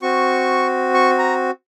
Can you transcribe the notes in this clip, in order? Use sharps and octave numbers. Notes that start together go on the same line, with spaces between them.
C4 F#4 C#6
C#6
A#5